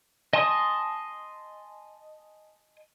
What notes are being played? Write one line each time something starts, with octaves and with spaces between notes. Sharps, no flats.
D#5 G#5 A5 C6 D#6